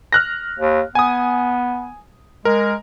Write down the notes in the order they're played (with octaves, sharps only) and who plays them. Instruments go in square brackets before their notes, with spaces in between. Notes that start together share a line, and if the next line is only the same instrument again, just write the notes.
[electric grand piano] F6 F#6 A#6
[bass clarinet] D#2
[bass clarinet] B3 [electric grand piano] G#5 D#6
[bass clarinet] G#3 [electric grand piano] A#4